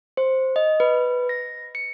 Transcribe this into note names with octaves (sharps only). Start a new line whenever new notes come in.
C5
D#5
B4
A#6
C#7